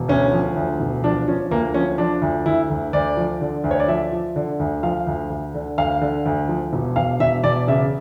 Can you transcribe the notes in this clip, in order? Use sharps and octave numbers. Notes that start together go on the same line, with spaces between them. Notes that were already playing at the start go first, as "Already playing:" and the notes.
Already playing: E1
D2 C#4
F3
D2
E1
F3 D4
F3 C#4
D2 A#3
F3 C#4
F3 D4
D2
D2 E4
D2
D2 D5
F3
D3
D2
C#5
D5
F3 E5
F3
D3
D2
F3 F5
D2
D2
D3
D2 F5
D3
D2
F3
E1
E1 F5
E1 E5
E1 D5
C#3 E5